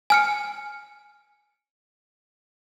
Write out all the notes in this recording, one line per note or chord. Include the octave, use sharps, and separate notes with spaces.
G#5 F6 C#7